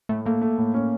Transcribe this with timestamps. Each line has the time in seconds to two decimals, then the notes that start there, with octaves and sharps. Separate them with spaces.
0.09 A2 A3
0.26 A3 A#3
0.41 A3
0.58 A2
0.74 C#4